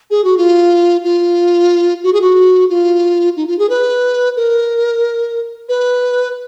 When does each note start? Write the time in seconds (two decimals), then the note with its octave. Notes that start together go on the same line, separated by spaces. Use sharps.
0.10 G#4
0.24 F#4
0.37 F4
1.04 F4
2.03 F#4
2.12 G#4
2.21 F#4
2.69 F4
3.36 D#4
3.47 F4
3.58 G#4
3.69 B4
4.36 A#4
5.68 B4